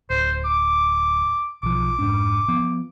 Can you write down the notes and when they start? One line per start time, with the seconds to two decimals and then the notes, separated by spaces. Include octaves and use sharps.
0.10 D1 C5
0.45 D6
1.63 B1 F3 D6
1.99 F1 G#2 D4
2.48 F3 B3